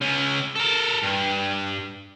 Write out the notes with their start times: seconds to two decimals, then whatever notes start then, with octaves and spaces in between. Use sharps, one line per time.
0.01 C#2 C#4
0.55 A4 A#4
1.03 G2